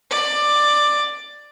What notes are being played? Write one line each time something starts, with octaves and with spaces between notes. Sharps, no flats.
D5